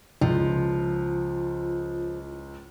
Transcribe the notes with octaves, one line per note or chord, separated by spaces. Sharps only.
C#2 F3